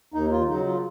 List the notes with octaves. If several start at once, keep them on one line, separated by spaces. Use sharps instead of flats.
D#2 D#4
F4
C#3 F#3 D#4
F4